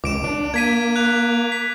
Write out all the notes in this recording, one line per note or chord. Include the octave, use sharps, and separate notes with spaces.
C#2 D6 D7 E7
D4
A#3 G#6 B6 D#7
F#6 F7
B6